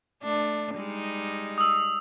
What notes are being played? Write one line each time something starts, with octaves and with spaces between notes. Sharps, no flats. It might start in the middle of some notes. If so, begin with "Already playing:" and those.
A3 D4
G3 G#3 D#4
D#6 E6